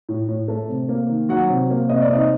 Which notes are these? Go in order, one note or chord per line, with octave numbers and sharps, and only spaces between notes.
A2
A2
A3
C3
A#3
D#3
F#3 F#4 F#5
C3
A#3
C3 D#5
D5
C3 D#4 D#5